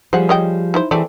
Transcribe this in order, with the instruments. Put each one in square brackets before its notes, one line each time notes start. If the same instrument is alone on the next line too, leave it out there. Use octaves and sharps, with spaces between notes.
[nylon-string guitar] F3 G3 G#4 [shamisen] C5 F#5
[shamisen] C#5 D#5 G5
D#4 E4 C5
[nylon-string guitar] E3 E4 G#4 [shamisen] A3 C4 D5